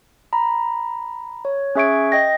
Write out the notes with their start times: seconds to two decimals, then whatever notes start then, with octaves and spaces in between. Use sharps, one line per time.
0.33 A#5 B5
1.45 C#5
1.75 C#4 G#4 E5 C#6 G#6 D7
2.12 D#5 G5 A#6